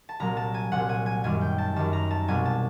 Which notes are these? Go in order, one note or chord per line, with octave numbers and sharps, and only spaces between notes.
A5
C2 A#2 F#3 A#5
A5
G#5
C2 A#2 F#3 F#5
G#5
G#5
F#2 D#3 G3 G#5
G5
A5
F#2 D#3 G3 A5
A#5
A5
C2 B2 G3 G#5
A5